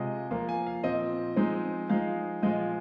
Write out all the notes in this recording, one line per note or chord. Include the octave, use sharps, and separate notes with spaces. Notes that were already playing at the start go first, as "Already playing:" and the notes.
Already playing: C3 G#3 F4 D#5
F3 A#3 F4
G#5
F5
A#2 F3 C4 D#5
F3 G#3 C4 D#4
F3 G#3 D#4 F5
A#2 F3 G#3 F4 D#5